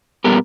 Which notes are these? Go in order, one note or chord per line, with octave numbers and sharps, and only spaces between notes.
A#2 G3 B3 G4 A#4